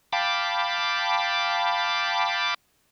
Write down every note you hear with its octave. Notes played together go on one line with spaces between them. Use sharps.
F5 G5 A5 B5 D6